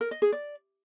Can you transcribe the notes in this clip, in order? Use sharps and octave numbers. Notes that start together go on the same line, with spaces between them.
A#4
D#5
G#4
D5